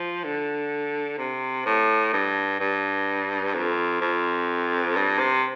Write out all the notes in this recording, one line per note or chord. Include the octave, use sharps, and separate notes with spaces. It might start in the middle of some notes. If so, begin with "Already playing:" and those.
Already playing: F3
D3
C3
A2
G2
G2
F2
F2
G2
C3